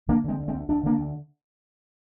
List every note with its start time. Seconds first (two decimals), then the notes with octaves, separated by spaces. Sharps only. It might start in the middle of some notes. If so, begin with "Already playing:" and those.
0.08 D3 A#3 D4
0.24 D3 G#3 C4
0.39 D2
0.48 G#3 C4
0.54 D2
0.69 D2 D4
0.83 D3 A#3 D4
0.98 D2